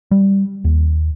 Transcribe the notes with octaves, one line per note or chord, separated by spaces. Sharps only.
G3
D#2